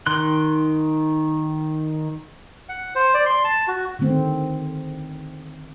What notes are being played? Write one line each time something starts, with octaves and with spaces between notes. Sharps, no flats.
D#3 C6 F#6
F#5
C5
D5
C6
A5
F#4
D3 D#3 A3 C4